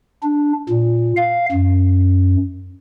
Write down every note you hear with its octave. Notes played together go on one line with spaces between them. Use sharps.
D4
A#2
F5
F#2